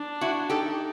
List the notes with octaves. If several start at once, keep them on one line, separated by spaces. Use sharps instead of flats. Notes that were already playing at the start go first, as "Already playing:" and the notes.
Already playing: D4
E4 F#4
D#4 G4 A4